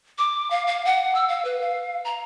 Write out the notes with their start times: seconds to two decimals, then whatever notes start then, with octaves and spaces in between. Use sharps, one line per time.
0.18 D6
0.51 F5
0.67 F5
0.85 F#5
1.15 E6
1.28 F5
1.45 B4
1.61 F5
2.05 A#5